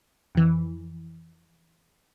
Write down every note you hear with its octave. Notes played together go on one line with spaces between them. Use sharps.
F2 E3